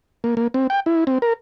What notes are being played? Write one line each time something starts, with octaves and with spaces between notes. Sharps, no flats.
A#3
A#3
C4
G5
E4
C4
A#4